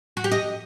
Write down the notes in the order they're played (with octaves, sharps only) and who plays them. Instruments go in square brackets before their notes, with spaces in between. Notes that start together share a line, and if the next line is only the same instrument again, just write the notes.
[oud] F#4
G4
D#5